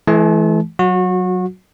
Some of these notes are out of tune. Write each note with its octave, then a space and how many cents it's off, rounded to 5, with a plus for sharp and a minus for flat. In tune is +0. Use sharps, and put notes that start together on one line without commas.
E3 +0 A3 -45 A5 -40
F#3 +0 F#4 -30